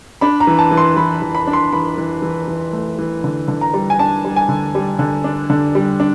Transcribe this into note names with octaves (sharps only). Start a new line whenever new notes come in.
D4 B5
A#5
E3
A5
E3
C6
E3 B5
E3
B5
D4
C6
E3 B5
E3
E3
E3
A3
E3
D3
D3
A#5
G3
G#5
D4 A5
G3
G#5
D3
G3
D3
D4
D3
G3
D4